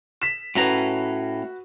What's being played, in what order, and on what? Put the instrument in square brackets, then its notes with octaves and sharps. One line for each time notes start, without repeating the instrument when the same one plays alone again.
[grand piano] B6 E7
[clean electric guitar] A2 C#4 A#5 [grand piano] F#4 B4